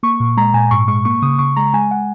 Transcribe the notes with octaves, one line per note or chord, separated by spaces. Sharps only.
A#3 C#6
A#2
G#3 A#5
A#2 G#5
G#2 C#6
G#3 C#6
A#3 C#6
C#3 D#6
C#3 C#6
G#3 A#5
G#3 G#5
F#5